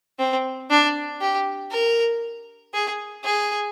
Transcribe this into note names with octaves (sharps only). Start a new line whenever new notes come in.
C4
D4
G4
A#4
G#4
G#4